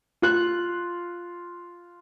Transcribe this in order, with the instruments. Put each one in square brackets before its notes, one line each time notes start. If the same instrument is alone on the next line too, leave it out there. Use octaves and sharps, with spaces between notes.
[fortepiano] F4 F#6